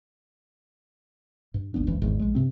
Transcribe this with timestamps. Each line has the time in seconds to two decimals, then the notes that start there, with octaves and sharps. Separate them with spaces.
1.54 G2
1.74 G#1 D#2 B3 D4
1.87 F#1 C#2 F#2 E3
2.02 G#1 E2 G#2 D#3
2.19 A#1 G#3
2.35 G2 C3 C4